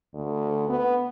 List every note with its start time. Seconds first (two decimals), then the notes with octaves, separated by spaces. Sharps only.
0.14 D2
0.69 B3